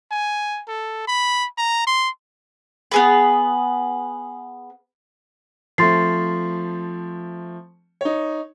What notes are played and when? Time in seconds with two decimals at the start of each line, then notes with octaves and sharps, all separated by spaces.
0.11 G#5
0.68 A4
1.07 B5
1.58 A#5
1.87 C6
2.92 B3 G#4 B4
5.78 F3 A3 C4 C6 A6 C7
8.01 D#4 C#5